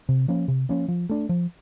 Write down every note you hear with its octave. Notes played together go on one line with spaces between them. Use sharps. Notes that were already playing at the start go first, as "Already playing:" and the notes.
C3
F3 A#3 C#4
C3
F3 A#3 C#4
F3
A3 D4
F3